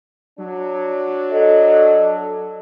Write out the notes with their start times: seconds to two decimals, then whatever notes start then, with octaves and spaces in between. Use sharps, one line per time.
0.39 F#3 D4
1.32 A4 D#5